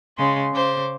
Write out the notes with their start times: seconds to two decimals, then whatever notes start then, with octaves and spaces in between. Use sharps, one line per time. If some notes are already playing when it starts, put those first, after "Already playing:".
0.17 C#3 G#3 C6
0.52 C#3 C5 D6